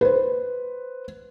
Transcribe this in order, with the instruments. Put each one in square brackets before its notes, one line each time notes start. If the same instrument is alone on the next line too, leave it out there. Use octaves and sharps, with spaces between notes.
[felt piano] B4 C5